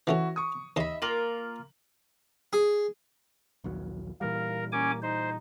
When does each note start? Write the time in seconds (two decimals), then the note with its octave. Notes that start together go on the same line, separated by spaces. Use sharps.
0.07 E3 A3 C#4 E4 F#4
0.36 C#6 D#6
0.76 D#2 D#5 E5 B5 C6
1.02 A#3 F4 A#4 F#7
2.53 G#4
3.64 A#1 D#2 F#3
4.21 A#2 E3 G3 A#4 F5
4.72 A#3 C#4 G#5 D6
5.03 D#4 C5